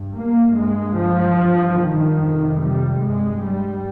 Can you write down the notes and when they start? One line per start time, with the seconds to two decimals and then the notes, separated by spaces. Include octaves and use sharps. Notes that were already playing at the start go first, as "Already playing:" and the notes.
Already playing: G2
0.16 A#3
0.57 G2 G#3
0.97 F3
1.38 G2
1.80 D#3
2.21 F2 C3
2.62 G3
3.02 G2 G#3
3.44 G3